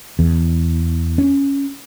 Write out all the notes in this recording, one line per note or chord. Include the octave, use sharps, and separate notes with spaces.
E2
C#4